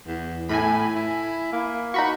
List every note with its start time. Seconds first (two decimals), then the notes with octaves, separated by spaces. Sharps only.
0.07 E2
0.49 A2 G#5 B5
0.96 E4
1.52 A#3
1.94 D#4 F#4 B5 C#6